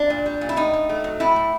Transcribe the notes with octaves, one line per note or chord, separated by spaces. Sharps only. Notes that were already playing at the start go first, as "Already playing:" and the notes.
Already playing: D4
A#2
G3
A#2
E4
A2 D#4
A2
A3
F#3
A2 E4
A2